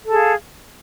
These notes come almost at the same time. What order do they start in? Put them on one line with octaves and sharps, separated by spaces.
A4 G#4 F5